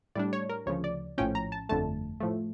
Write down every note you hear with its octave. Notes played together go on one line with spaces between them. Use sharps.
A2 G3 D4 D5
C#5
A#4
D2 C#3 F3 C#5
D5
A#1 A2 F3 C#4 G5
A#5
A5
G1 F2 D3 A3 A5
A2 F3 A3